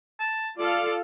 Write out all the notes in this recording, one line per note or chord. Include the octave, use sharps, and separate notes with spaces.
A5
F4 A4 D5 F5